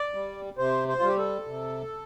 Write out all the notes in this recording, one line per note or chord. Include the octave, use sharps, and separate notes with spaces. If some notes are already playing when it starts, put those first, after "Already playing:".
Already playing: D5
G3
C3 C5
C5
G3 F4
G4
A4
C3